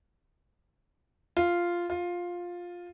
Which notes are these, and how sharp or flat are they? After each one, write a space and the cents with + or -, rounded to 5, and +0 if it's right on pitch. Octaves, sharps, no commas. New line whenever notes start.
F4 -5
F4 +10